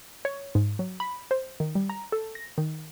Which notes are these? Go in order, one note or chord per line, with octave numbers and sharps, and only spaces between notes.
C#5
G#2
F#3
B5
C5
D#3
G3
A#5
A4
A#6
D#3